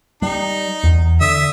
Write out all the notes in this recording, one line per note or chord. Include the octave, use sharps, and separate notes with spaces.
G3 D#4
E2
D3 E5 D#6